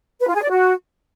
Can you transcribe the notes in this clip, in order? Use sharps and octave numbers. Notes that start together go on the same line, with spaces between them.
B4
F4
G#4
D5
F#4